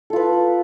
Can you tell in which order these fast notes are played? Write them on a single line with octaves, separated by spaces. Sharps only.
A4 F4 B4